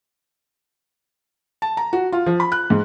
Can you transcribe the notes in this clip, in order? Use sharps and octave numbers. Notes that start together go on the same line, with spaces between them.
A5
A#5
F#4
F4
F3
B5
F#6
G#2